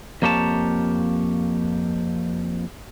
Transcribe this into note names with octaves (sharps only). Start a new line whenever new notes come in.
F2 A#3 G4 C#5 A5